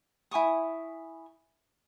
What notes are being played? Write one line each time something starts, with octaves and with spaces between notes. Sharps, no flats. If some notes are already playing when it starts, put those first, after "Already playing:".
E4 G#5 C#6 D#6